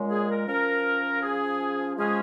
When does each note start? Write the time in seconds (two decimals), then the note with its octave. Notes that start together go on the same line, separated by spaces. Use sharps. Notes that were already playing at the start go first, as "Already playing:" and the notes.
Already playing: A#2 G#3 C#4
0.09 G#4
0.29 A#4
0.47 F3 C#4 A#4
1.22 G#4
1.97 F3 G#3 C#4 G#4